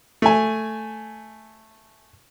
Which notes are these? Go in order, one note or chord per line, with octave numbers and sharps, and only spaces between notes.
A3 G#5